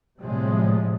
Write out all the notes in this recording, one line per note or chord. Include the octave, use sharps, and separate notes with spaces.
A2 C3 F3 G3 G#3